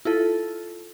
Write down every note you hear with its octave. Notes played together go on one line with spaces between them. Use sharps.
E4 F4 A4